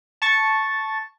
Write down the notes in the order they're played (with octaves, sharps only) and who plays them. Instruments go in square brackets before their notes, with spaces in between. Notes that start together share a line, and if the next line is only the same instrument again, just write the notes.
[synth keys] A5 C#6 A6